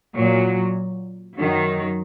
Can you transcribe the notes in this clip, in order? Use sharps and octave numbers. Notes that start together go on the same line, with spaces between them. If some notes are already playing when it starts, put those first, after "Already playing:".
A#2 F#3
F#2 D#3 F#3